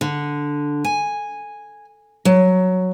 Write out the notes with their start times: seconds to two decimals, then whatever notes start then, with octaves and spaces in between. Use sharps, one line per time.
0.01 D3
0.85 G#5
2.25 F#3